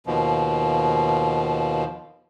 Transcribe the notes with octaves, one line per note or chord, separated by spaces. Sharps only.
D#2 B2 F3